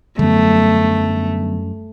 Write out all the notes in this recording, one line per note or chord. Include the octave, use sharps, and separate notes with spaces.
F#2 D3 F#3 G3 A3 B3